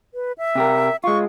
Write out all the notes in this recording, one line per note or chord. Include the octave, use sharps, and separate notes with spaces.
B4
E5
C3 G4 A#4
G#3 F4 C#6